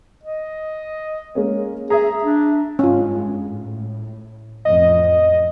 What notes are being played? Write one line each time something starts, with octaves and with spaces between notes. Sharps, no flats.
D#5
G#3 A#3 C#4
G#4 E5 A#5
D4
G#1 G2 G#3 C#4 F4
A2
A1 F2 D#5